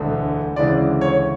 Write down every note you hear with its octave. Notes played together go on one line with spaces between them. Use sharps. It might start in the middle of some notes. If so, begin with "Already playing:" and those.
Already playing: E1 D2 D3 A3
D2 C#3 E3 G#3 C#4 D5
C#5